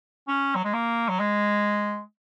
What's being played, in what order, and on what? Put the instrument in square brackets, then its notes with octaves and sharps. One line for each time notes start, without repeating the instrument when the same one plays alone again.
[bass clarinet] C#4
F#3
G#3
A#3
F#3
G#3